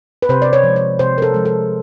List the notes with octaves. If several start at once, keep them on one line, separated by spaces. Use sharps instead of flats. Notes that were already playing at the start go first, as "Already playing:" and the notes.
B4
C3 C5
D5
C#5
F3 G#3
C#5
C3 C5
A#4
A4
F3 G#3
A4